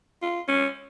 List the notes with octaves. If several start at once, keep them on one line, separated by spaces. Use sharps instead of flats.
F4
C#4